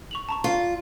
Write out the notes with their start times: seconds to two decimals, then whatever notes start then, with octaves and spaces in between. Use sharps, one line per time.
0.11 C#6 F7 F#7
0.29 A5 A#5 C#6
0.44 F4